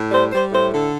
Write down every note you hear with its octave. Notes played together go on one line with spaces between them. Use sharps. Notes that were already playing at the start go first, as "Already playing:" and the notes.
Already playing: A2
G3 C5
G3 C5
A2 C5
D3 A4